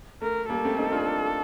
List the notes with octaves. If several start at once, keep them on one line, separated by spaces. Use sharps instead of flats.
A3 A#4
G3 A#3 A4
A3 C4
C4 D#4
D4 F4